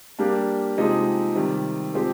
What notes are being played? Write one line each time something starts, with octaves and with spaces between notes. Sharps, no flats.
G3 A#3 D4 G4
C3 F3 G#3 D#4 G4
C3 D#3 G3
F3 G#3 C4 G4